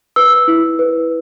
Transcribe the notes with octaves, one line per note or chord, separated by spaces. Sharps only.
B4 E6
E4
B4